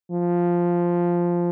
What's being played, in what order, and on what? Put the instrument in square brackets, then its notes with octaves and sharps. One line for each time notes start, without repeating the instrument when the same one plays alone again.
[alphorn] F3